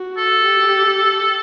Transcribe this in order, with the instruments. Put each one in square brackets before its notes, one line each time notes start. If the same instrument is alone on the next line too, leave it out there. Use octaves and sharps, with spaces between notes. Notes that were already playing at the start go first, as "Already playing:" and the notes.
Already playing: [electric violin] F#4
[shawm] A4
[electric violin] G4